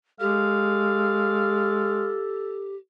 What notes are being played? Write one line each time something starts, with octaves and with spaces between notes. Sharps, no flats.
G#3 G4 A4 F5